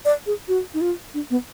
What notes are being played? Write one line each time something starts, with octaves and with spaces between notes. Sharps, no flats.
D5
G#4
F#4
D#4
F4
D4
B3